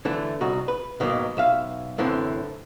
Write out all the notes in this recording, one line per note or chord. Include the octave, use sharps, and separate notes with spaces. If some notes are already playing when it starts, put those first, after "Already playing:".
D3 E3 A3 E4
C2 D#4 F#4
B4
G#2 B2 D#3 F#3 A#3
B1 E5 F5
F#2 A2 D3 E3 C4